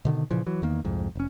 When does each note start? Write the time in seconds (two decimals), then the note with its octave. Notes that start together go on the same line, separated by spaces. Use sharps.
0.05 B2 D3 D#3
0.31 A#2 C#3 E3 F3
0.46 E3 F#3
0.62 E2 D#3 A#3
0.85 C2 F2 G#2
1.15 F1 C#4